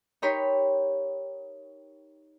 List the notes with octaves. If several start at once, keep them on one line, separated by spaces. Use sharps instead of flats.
D#4 G4 A#4 C#5 B5 C6